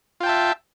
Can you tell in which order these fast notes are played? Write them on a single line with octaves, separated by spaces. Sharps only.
F4 G5 A5 E5